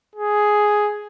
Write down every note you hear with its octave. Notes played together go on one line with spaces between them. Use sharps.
G#4